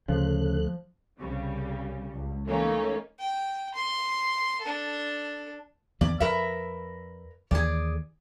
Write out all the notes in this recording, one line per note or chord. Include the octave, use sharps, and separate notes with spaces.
D2 C#3 F3 A3 F#6
C2 C#3 G3
C#2
E3 A3 A#3 C#4 D#4
G5
C6
D4 A4
E2 D#3 B3 D5
F2 A#4 B4 E5
D#2 D#3 E3 G#4 D5